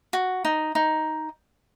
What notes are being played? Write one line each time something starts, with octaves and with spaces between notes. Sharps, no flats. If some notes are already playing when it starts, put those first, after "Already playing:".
F#4
D#4
D#4